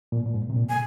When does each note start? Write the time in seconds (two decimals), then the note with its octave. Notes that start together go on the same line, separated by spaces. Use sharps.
0.12 A#2
0.26 A#2
0.34 G#2
0.50 C3
0.56 A#2
0.69 G#5